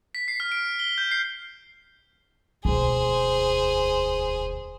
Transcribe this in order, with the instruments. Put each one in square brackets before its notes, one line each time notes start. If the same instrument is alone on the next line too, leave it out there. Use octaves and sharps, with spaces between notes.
[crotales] B6
C7
F6
D7
G7
G6
C7
[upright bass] E1 D2 [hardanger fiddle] G#4 C5